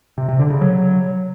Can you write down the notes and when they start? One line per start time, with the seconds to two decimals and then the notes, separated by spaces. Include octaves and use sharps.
0.18 C3
0.29 C3
0.39 D3
0.50 C#3
0.61 F#3